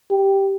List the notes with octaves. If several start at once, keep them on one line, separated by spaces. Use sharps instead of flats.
G4